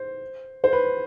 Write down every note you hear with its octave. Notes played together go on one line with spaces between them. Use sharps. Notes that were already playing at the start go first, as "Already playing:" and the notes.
Already playing: C5
C5
B4